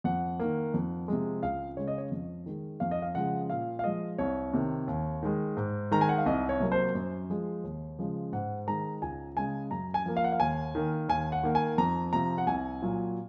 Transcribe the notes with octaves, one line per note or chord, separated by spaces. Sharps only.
F2 F#5
D#3 A#3
F2
C3 F3 G#3
C#2 F5
C#3 G#3 C#5
D#5
C#5
F2
D#3 G#3
F2 F5
D#5
F5
C#3 F3 G#3 F#5
A#2 F5
F5
F3 G#3 D#5
C2 C#5
C3 D#3
D#2
D#3 G#3
G#2
D#3 G#3 A#5
G#5
F#5
F5
C2 D#5
C#5
C3 F#3 A#3
C5
F#2
F3 G#3
D#2
C#3 F3 G#3
G#2 F#5
D#3 G#3 A#5
C#2 G#5
C#3 G#3 G#5
F#2 A#5
G#5
F3 A#3
F5
F#5
F5
D#2 G#5
D#3 A#3
D#2 G#5
F#5
D#3 A#3
G#5
F2 A#5
C3 F3 A#5
F#5
C2 G#5
A#2 F#3